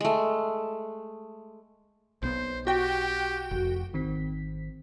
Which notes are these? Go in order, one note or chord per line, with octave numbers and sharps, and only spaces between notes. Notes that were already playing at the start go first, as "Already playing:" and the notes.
G#3 A3
B1 B3 C5
F#4 G4 G5
F1
G#1 D#3 C4 B6